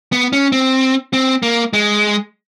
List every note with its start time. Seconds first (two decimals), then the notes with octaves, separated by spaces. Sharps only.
0.12 B3
0.33 C#4
0.52 C4
1.13 C4
1.43 A#3
1.73 G#3